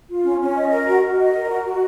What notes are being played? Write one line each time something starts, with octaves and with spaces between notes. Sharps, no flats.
F4
C#4
C#4
D#5
A#4
F#4
F#4
D#5
A#4
F#4
F#4